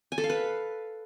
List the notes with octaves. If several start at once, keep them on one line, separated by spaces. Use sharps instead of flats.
G#5
A4
F5
B4